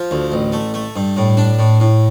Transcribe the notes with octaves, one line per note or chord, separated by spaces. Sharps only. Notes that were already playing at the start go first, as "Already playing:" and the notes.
Already playing: F3
D2
A1
A3
A3
G2
A2
D4
A2
A2